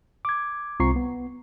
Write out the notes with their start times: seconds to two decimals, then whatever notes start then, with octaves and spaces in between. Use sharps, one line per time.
0.25 D6 G#6
0.80 C2 C4 F4 A#5 C#6 C7
0.96 B3